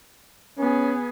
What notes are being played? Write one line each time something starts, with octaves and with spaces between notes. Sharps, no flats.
B3 C#4 G#4